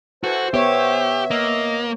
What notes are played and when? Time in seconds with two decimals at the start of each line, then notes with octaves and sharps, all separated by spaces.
0.24 E3 F#4 A4 C5
0.54 B3 G4 C#5 E5
1.31 A#3 D#5